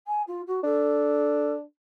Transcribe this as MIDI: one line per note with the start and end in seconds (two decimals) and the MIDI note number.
0.07 0.22 80
0.27 0.42 65
0.47 0.60 66
0.64 1.62 62
0.64 1.52 69